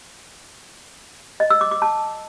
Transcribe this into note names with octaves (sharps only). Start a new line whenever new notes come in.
D#5
E6
D6
D6
A5